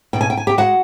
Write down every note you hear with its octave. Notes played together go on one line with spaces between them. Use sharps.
B2 G5
G#5
G5
G#5
G4 G5
G#3 F#4 F#5